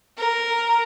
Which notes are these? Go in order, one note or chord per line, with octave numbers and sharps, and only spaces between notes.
A#4